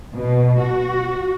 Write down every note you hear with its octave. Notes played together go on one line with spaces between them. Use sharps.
B2
F#4